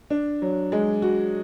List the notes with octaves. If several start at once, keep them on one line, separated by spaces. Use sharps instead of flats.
D4
F#3
G#3
F#4